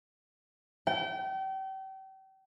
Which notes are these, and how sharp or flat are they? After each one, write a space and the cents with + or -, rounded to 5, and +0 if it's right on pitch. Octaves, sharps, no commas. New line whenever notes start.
G5 -35